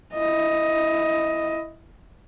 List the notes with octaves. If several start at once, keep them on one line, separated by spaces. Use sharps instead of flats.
E4 D#5